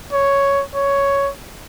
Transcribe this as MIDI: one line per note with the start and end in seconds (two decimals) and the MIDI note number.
0.13 0.63 73
0.75 1.30 73